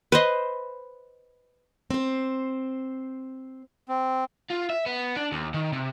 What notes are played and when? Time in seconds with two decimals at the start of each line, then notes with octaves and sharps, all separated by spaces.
0.12 B4 C5 D#5
1.91 C4 C5
3.89 C4
4.50 F4
4.70 E5
4.86 B3
5.17 D4
5.32 D#2
5.54 D#3
5.73 C3